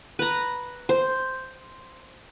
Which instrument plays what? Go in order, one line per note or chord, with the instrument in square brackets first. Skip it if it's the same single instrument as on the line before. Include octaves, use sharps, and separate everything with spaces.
[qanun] B4 A#5
C5